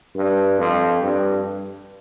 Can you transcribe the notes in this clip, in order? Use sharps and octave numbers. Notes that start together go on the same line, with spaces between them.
G2
F2
G2